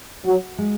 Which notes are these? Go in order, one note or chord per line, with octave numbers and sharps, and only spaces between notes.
F#3 F#4
G#3